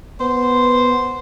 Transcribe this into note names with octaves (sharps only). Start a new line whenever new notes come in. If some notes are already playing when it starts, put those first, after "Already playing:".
B3 C5